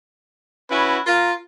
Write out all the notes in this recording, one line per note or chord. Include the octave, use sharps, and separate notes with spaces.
C#4 E4 F#4 B4
F4 A#4